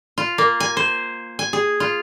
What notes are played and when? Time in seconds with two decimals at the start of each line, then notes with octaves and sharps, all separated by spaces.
0.18 F4
0.38 A#3
0.60 G#5
0.77 C5
1.39 G#5
1.53 G#4
1.80 F4